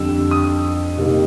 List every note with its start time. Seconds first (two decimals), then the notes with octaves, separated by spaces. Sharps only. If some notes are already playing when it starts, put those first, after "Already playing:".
Already playing: F2 D3 G3 E6
0.31 D#6
0.97 C3 D#3 G3 A#3